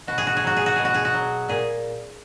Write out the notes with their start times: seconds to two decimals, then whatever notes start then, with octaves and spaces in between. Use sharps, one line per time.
0.07 B2 F#4
0.18 G#4
0.27 F#4
0.37 G#4
0.44 F#3 F#4
0.57 G#4
0.66 F#4
0.76 B2 G#4
0.85 F#4
0.94 G#4
1.05 F#4
1.14 F#3
1.49 A#2 G#4